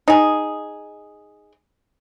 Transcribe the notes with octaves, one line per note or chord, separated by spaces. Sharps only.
D#4 G#4